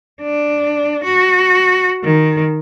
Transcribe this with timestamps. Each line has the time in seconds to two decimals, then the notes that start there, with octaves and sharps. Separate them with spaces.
0.22 D4
1.04 F#4
2.04 D#3